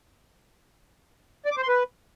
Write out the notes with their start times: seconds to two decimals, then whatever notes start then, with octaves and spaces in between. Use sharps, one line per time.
1.45 D5
1.51 D6
1.57 C5
1.63 C6
1.68 B4